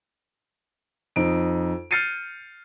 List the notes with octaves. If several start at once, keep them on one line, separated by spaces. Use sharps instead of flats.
F2 D#4 D7
F6 G6 A6 C7 C#7 D#7